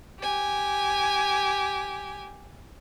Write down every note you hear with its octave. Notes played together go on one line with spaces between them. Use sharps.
G4 G#5